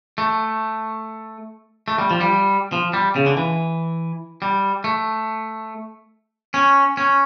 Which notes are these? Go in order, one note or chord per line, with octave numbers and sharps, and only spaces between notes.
A3
A3
G3
F3
G3
F3
G3
C#3
D3
E3
G3
A3
C#4
C#4